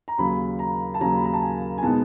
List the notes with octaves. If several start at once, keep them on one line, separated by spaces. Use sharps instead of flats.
A#5
D#2 C#3 F#3 B5
A#5
A5
D#2 C#3 F#3 A#5
B5
A#5
A5
G#5
G#5
B2 G#3 B3 D#4 A5